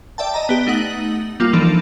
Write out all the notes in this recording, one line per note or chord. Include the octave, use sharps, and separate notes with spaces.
D5 E5 G5 A5
D#5 A#5
B3 G4
A3 D#4 F#5 D#6 F#7
G3 A#3 F4
E3 F3 D4 D#4 A4